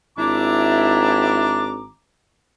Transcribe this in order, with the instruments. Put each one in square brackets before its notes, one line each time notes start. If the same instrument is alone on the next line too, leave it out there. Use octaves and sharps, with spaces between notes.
[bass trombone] G#1 [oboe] D4 [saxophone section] E4 [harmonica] A#5 D6